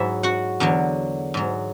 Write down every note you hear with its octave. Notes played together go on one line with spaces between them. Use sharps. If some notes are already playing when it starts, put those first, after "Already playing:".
Already playing: G#2 F#3 E4 E5
F#4 F#5
E2 D3 F#3
G#2 F#3